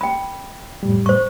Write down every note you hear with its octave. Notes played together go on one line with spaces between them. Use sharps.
G5 B5
F2 A2 G3
C5 C#6